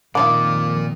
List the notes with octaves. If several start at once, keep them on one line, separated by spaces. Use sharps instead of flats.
F2 A#2 D#3 A#3 D#4 F4 F#5 D6